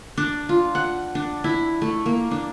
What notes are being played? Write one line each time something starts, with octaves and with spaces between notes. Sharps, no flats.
D4
F4
F#5
D4
E4
A3
A#3
D4